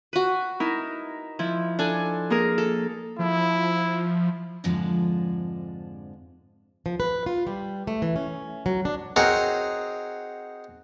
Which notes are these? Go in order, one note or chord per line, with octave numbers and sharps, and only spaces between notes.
F#4 B4
D#4 E4 A#4
F3 E4
D4 A4 G#5
A#3 G#4 A#4
A4
F3 E4
F2 G#2 D3 F3 G#3 D4
F3
B4
F4
G3
A3
E3
C#4
F#3
D4
C4 D#4 F#4 G#4 A#4 C#5